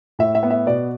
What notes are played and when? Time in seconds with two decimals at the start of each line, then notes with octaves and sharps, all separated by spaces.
0.19 A2 E5
0.35 E5
0.43 B3
0.50 E5
0.67 B2 D5